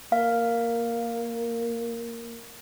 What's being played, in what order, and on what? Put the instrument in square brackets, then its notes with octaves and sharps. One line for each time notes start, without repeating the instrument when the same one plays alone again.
[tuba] A#3 [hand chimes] F5